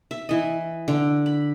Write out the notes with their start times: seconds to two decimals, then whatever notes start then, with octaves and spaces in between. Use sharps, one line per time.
0.11 E5
0.29 E3 D#5
0.88 D3
1.26 B5